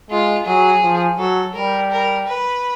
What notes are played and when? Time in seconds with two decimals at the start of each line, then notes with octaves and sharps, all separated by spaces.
0.10 G#3 F4
0.46 F#3 G#4
0.83 F3
1.18 F#3 A4
1.54 G3 A#4
1.91 A#4
2.27 B4